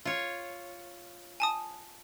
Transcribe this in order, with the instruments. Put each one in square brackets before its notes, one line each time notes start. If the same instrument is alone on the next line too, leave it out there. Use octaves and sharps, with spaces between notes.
[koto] F4 C#5
[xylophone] G#5 A5 D#6